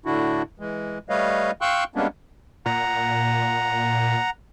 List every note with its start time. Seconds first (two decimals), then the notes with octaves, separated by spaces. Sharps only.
0.06 A2 D3 D4 E4 F#4
0.60 E3 G#3
1.09 G3 A3 B4 C#5 D#5 F5
1.61 F5 G5 C6 C#6 E6 F#6
1.95 G3 G#3 A#3 B3 C#4 D4
2.66 A#2 F#5 A#5